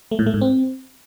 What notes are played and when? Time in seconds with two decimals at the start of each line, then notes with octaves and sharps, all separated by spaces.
0.11 A3
0.19 A2
0.26 A3
0.34 G#2
0.41 C4